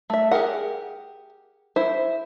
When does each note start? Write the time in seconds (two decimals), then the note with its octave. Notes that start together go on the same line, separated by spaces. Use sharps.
0.10 A3 E5
0.31 G4 G#4 A#4 F#5
1.76 E4 C5 E5